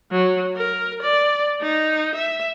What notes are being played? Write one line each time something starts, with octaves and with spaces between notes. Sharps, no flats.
F#3
A#4
D5
D#4
E5